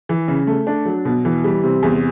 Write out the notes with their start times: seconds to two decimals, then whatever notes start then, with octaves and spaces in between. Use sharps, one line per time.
0.09 E3
0.28 C#3
0.47 A3
0.67 D4
0.85 F#3
1.05 B2
1.25 E3
1.44 G3
1.63 C3
1.83 E2